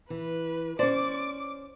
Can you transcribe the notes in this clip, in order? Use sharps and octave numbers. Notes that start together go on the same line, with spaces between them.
E3 B4
C#4 C5 D5 D6